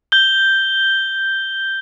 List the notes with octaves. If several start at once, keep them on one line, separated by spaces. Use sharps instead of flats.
G6 G7